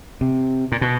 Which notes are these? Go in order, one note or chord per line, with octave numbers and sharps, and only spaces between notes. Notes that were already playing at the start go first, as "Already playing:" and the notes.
C3
A#2
B2